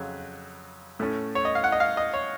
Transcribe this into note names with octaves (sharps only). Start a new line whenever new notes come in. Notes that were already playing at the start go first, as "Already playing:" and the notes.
Already playing: F2 C#3 F#3
A2 A3 C#4
C#5
D#5
F5
F#5
D#5
F5
D#5
C#5